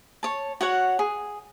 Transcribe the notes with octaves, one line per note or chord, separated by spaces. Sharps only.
C#5 A5
F#4 C#5 F#5
G#4